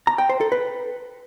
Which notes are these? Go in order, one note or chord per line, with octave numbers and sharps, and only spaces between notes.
A#5
G5
C5
A4
B4